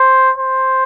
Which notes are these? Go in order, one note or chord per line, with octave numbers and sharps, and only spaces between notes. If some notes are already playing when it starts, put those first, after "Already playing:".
Already playing: C5
C5